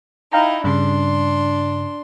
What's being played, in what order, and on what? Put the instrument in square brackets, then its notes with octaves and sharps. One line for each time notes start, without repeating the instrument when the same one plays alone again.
[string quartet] D#4 E4 [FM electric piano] F5 G5 A#5
[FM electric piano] G2 C#3 [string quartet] D4 C6